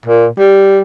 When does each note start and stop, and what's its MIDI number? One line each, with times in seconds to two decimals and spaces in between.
0.06 0.27 46
0.39 0.80 55